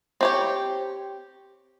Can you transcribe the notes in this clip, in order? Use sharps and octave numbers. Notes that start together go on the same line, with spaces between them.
C4 G4 C#5